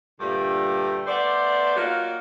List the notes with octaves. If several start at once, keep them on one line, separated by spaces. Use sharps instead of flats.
G2 A#2 D3 G3 A3
A3 B3 C5 D5
F#3 A#3 D#4 F4 F#4